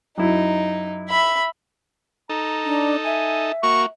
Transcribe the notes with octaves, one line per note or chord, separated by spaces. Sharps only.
F#2 D#4 E4
E5 B5
D#4 A4 A#5
D4
E5 G#5
A#3 F#4 C#6